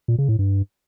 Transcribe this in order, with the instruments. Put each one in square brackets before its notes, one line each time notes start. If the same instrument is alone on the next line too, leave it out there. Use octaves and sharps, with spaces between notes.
[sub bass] A#2
C#3
A2
G2